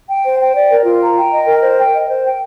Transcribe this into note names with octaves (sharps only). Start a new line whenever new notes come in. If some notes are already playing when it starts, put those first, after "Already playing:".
G5
C5
G5
D5
A#4
F4
A#5
G5
D#5
A#4
C5
G5
D#5
C5
G5